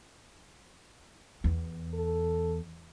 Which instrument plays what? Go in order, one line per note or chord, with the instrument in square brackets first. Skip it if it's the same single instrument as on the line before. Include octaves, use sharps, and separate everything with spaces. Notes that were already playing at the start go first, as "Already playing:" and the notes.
[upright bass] E2
[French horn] A4